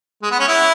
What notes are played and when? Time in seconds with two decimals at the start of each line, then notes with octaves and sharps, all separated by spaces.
0.23 G#3
0.31 B3
0.40 C#4
0.48 E4